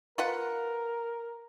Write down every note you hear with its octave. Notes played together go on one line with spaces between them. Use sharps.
F4 A#4 B4 F#5